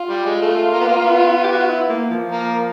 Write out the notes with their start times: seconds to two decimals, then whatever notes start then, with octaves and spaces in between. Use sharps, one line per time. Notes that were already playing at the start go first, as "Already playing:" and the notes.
Already playing: F4
0.09 G3
0.26 G#3
0.41 A3
0.73 A#3
0.80 B3
0.88 A#3
0.99 A#3
1.04 B3
1.44 G4
1.52 F#4
1.60 F4
1.68 E4
1.89 A#3
2.10 F3
2.32 A#3